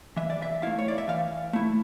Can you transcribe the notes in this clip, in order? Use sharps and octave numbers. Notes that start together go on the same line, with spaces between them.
E3 E5
D5
E5
A3 E4 F5
C#5
D5
E5
E3 F5
A3 E4